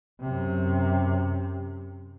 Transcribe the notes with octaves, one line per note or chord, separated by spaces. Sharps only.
F#2 C3